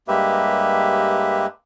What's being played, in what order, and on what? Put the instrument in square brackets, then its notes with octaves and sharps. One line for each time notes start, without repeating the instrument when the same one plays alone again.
[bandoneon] G2 G#3 A#3 G4 B4 E5